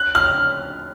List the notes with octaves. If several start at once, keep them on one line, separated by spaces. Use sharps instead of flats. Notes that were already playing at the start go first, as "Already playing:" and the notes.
Already playing: F#6
F6